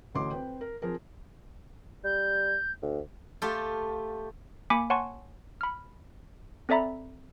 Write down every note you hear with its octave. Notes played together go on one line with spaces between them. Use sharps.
A1 D2 C#4 D#5 C6 D6
C4 B4 G5
A#4
F3 C4 G#4 A#4
G3 G6
D2
A3 F4 G4
A#3 G#5 B5 D6 B6 C#7
C#5 F#5 G#5 A5 C6 C#6
B5 F6
C4 A4 D5 E5 A#5 B5